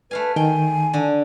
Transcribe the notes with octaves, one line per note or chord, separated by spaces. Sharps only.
A3 B4 F5 G#5
D#3 G5 G#5
D3